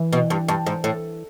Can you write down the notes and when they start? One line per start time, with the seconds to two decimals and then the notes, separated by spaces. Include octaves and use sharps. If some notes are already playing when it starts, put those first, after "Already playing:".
Already playing: E3
0.13 B2
0.30 G2
0.48 G2
0.67 G#2
0.84 A2